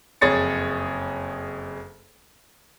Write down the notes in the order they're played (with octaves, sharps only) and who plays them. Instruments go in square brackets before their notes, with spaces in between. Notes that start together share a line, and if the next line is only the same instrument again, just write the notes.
[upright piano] F#1 F2 G#4 C#5 A6 C#7